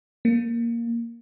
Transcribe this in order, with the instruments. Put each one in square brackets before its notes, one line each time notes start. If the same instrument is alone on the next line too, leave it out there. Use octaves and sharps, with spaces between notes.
[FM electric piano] A#3